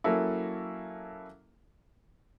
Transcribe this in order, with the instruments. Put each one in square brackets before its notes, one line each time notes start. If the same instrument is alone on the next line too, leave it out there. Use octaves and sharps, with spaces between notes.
[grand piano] F#3 A#3 C#4 E4 A4